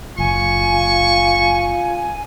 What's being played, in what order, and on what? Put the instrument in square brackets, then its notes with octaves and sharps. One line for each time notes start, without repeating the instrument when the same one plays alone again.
[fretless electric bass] F#1 [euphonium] F4 [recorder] G#5 [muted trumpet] C#6